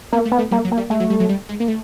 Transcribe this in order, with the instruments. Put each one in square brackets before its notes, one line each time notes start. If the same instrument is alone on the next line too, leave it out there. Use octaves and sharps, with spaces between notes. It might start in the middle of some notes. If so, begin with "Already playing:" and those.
[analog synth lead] A#3 [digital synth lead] B3
[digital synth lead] A3
[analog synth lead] B3
[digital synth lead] A3
[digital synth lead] G3 [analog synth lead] A#3
[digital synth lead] F#3
[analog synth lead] A#3
[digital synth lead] G3
[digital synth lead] G#3 [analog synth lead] A3
[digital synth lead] F#3
G3
F#3
G3
G#3
A#3
A3